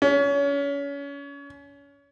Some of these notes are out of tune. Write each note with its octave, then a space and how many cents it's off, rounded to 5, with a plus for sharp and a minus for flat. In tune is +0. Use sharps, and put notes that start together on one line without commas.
C#4 +30